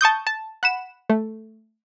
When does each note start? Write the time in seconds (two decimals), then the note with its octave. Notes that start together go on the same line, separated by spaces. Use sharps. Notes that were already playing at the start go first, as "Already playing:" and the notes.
0.01 A5 C#6 D#6 G6
0.27 A5
0.63 F#5 B5 E7
1.09 A3